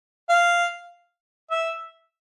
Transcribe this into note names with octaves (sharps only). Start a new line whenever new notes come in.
F5
E5